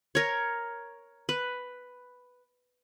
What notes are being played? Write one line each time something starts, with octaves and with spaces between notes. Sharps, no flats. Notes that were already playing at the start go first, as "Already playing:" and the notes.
A#4 C#5
B4